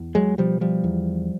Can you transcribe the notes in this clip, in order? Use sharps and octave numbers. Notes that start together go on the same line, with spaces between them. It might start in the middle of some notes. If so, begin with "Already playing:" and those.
Already playing: E2
F#3 G#3
B2 F3 G3
F3 G3
E2